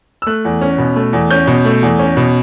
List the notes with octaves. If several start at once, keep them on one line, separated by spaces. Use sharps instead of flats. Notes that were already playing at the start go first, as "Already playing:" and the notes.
E6
A3 F#6
E2
C#4
B2
A3
E2
C#4 G6
B2
A3
E2
C#4
B2